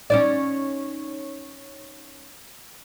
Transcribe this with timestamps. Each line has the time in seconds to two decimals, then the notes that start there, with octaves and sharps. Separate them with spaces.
0.10 C#4 D#4 D5